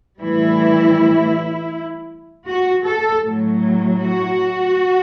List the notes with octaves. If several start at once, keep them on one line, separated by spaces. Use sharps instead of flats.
A2 E3 G3 E4
F#4
A4
A2 F#3
F#4